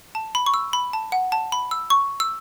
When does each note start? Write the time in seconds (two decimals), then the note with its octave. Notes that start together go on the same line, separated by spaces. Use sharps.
0.15 A5
0.35 B5
0.46 C#6
0.54 E6
0.73 B5
0.93 A5
1.12 F#5
1.32 A5
1.52 B5
1.71 E6
1.90 C#6
2.20 E6